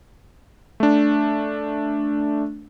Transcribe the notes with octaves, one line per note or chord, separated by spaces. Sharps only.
A3 D4